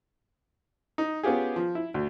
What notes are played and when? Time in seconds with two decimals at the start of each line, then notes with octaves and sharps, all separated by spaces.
0.98 D#4
1.23 B3 C#4 F4 G4 G#4
1.56 F3
1.75 E4
1.94 D2